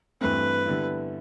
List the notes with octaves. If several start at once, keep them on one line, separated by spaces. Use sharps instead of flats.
G2 E3 A3 C4 B4
D3 G3 B3 E4